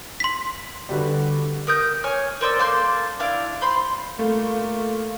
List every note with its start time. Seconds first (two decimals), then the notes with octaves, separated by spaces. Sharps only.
0.20 C6 B6
0.89 D3 G3 F#4 B4
1.67 A#4 D#6 G6
2.04 C#5 G#5 F6
2.41 A#4 C5 D5 E6
2.59 A#3 A4 C6 G6
3.19 D4 E4 F5
3.61 C5 B5 C6
4.19 A3 A#3 F4